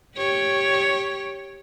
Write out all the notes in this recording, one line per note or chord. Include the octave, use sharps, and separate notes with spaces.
G4 C#5